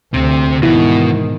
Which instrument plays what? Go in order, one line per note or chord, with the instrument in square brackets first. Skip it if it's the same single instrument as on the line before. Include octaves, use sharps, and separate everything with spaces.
[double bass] D2 [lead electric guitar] C3 C4
[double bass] G#2 D#3 [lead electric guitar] B2 [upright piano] E3